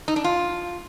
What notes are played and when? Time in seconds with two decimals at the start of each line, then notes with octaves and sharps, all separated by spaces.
0.08 D#4
0.16 D4
0.24 F4